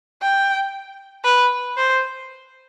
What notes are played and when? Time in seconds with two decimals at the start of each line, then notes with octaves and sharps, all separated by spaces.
0.22 G5
1.25 B4
1.77 C5